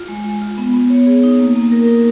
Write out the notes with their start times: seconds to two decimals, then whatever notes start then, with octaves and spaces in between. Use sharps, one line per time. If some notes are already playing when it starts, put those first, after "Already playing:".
Already playing: F4
0.08 G#3
0.24 G#3
0.42 F4
0.58 B3
0.74 B3
0.90 C#5
1.07 G#4
1.23 D#4
1.40 A#3
1.56 A#3
1.72 A#4
1.88 D#4